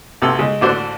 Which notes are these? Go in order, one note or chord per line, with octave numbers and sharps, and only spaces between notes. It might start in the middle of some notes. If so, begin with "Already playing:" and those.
B1 C3 A4 E6
C#3 G#3
A1 D3 D4 F#4 C5